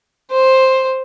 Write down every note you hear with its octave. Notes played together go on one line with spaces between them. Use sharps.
C5